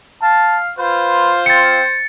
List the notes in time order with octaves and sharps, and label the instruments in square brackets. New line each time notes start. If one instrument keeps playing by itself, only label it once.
[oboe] F5 [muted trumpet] A5
[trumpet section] F4 [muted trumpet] B4 [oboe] C5
[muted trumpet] C4 [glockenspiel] A6 C#7